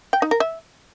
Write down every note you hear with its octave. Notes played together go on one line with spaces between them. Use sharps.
G5
D#4
A#4
E5